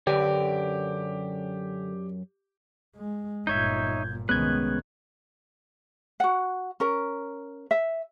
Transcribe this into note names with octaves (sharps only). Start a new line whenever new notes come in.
F#2 D3 G4 A#4 B4 C#5 D5 G5
G#3
G1 A#2 D#4 C#5 E5 G6 G#6
C2 D#3 G#3 B3 C#4 F#6 G#6
F#4 F#5
C#4 A#4
E5